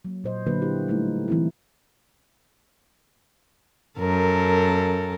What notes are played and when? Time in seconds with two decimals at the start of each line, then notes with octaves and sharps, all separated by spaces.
0.05 F#3 A#3
0.24 A#2 C5 D#5
0.46 D3 F#3 A#3 D4 F#4 B4
0.61 D4 E4 G4
0.88 G3 A3 D#4 E4
1.28 E3 C4 E4
3.99 F#2 A4 A#4